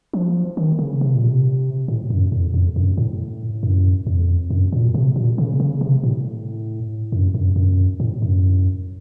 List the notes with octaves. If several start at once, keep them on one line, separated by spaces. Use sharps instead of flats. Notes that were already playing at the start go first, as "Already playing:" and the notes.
F3
D#3
C#3
C3
A#2
C3
A2
F#2
F2
F2
F#2
A2
F#2
F2
F#2
A#2
C3
A#2
C#3
C#3
C3
A2
F#2
F#2
F#2
A2
F#2